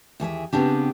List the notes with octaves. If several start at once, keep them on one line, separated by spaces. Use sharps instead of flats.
D#2 E3 G#4 E5
C#3 B3 C4 D4 G4